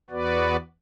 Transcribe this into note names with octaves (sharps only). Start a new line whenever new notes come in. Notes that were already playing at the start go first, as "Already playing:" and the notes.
E2 B3 F#4 B4 D5